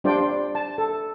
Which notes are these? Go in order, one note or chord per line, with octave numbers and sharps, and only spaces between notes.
G3 D4 F4 C5 D5 G5
A5
A4